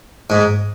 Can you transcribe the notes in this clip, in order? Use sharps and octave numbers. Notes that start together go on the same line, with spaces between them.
G#2